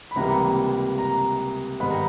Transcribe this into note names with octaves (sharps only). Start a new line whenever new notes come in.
B5
C#2 C3 E3 G3 A#3 A#5
A#5
G#2 D#3 G3 B3 B5
A#5